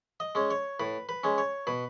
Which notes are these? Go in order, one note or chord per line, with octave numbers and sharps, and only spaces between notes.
D#5
G#3 C#4
C#5
A2 B4
B4
G#3 C#4
C#5
B2 B4